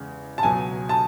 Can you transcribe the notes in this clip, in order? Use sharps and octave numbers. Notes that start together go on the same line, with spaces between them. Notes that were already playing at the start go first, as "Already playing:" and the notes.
Already playing: E2 C#3 G#3
A5
C#2 B2 F#3 G#5
A5